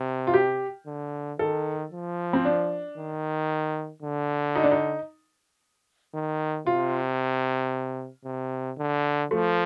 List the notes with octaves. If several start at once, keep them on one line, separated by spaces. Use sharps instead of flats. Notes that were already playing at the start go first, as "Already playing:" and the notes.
Already playing: C3
F4
G4
D3
D#3 A4
F3
C4
D4
D#3
D3
D#4
D4
D#4
D#3
C3 F4
C3
D3
F3 A3